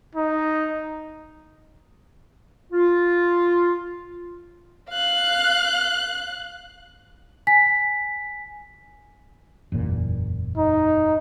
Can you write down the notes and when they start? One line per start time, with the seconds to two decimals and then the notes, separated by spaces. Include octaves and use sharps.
0.15 D#4
2.72 F4
4.90 F5 F#6
7.47 G#5 B6
9.72 F#1 E2 A#2
10.58 D#4